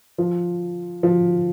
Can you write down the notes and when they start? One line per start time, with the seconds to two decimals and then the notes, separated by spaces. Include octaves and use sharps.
0.18 F3
1.03 F3